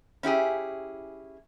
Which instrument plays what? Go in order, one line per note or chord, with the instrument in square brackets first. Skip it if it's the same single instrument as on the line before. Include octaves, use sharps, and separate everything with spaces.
[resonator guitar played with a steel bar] C#4 E4 G4 G#4